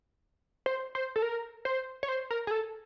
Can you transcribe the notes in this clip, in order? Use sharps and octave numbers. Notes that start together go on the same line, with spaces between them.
C5
C5
A4
A#4
C5
C#5
C5
A#4
G#4
A4